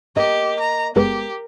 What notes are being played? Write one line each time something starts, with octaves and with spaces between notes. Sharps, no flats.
A#3 G4 D#5
A#5
G1 G#3 B3 G4 A#4